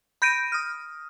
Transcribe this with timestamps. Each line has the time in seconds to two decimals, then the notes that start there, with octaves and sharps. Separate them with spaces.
0.22 B5 G6 A#6 D7 D#7
0.52 D#6 F6